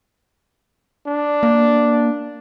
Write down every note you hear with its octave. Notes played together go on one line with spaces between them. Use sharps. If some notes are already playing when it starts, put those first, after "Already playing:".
D4
A#3